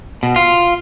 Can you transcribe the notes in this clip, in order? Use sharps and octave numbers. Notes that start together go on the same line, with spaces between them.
B2
F4